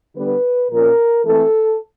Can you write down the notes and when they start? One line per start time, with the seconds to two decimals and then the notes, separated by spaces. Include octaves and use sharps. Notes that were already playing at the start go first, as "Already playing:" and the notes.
0.16 D3 G3 B3 B4
0.71 A#2 F3 A#3 C#4 A#4
1.25 E3 A3 C4 A4